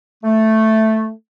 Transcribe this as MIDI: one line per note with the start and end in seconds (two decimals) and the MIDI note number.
0.24 1.10 57